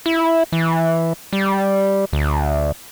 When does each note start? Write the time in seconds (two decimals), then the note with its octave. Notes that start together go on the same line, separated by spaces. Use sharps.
0.06 E4
0.52 E3
1.33 G3
2.13 D2